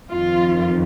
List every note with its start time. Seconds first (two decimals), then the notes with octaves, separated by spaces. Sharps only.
0.11 F2 D#3 F4